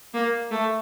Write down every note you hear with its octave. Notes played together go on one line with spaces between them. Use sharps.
A#3
A3